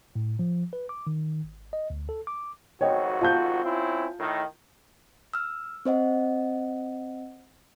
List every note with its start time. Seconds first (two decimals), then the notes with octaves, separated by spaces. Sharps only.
0.15 A2
0.39 F3
0.73 B4
0.89 D6
1.07 D#3
1.44 G#1
1.73 D#5
1.90 D2
2.09 A4
2.27 D6
2.81 G#1 F2 F#4 C#5 D#5 G5
3.21 F4 A5 G6
3.64 C4 C#4 E4
4.20 A2 D#3
5.34 E6 F6
5.85 C4 C5 D#5 F#5